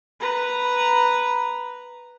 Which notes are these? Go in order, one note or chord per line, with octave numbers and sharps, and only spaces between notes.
B4 A#5